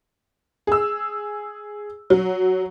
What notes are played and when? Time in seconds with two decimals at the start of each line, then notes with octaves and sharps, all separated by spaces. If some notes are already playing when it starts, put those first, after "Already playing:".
0.67 G#4 E6
2.10 F#3